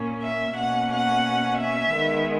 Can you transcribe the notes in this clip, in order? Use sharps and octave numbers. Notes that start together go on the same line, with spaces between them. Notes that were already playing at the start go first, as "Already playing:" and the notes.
Already playing: A#2 A#3 C#4
E5
B2 A#3 C#4 F#5
F#5
E5
D#3 G#3 B3